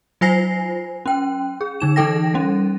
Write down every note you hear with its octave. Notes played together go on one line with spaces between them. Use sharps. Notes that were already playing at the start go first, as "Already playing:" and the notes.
F#3 F4 C5 G#5 A#6 C7
C#4 G5
G#4
D3 D#4 E7
E3 D#4 A4 G5 A#6
G3 C#4